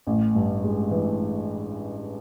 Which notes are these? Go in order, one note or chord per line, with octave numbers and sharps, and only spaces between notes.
A1
G2
G#3
E3